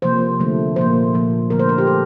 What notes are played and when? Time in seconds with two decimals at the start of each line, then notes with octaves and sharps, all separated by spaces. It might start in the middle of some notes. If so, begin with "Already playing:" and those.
0.02 C3 F3 A#3 C5
0.40 D3 F3 A3
0.76 A#2 F3 A#3 C5
1.13 A#2 F3 A#3
1.50 D3 F3 A3 A#4
1.60 C5
1.69 A#4
1.78 G4
1.87 A3 A4